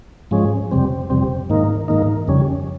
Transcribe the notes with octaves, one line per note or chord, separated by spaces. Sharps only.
G#2 F3 G#3 C#4
F2 C3 G3 C4
F2 C3 G3 C4
G#2 D#3 A#3 D#4
G#2 D#3 A#3 D#4
F2 C#3 G3 C#4